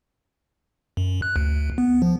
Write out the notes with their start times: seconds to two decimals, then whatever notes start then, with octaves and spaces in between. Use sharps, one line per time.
0.97 F#2
1.22 F#6
1.36 D2
1.78 B3
2.02 F3